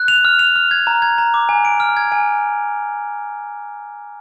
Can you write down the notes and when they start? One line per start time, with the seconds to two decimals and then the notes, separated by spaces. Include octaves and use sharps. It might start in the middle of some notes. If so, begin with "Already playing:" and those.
Already playing: F#6
0.08 F7
0.25 F6
0.39 F7
0.56 F6
0.71 G#6
0.87 A#5
1.02 G#6
1.18 A#5
1.34 D6
1.49 G#5
1.65 D7
1.80 F6
1.97 G#6
2.12 G#5